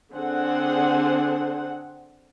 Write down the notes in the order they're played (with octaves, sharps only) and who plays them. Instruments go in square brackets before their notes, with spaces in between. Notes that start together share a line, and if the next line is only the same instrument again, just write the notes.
[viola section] D3 C4 D4 G#4 C5 F#5